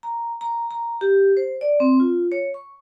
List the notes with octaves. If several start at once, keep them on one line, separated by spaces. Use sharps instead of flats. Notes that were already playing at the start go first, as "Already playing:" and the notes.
A#5
A#5
A#5
G4
C5
D5
C4
F4
C#5
C#6